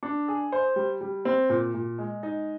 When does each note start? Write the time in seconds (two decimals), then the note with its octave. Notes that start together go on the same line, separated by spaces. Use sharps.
0.03 D4
0.28 G#4
0.52 C5
0.76 G3
1.01 G3
1.25 C4
1.49 A#2
1.74 A#2
1.98 G#3
2.23 D#4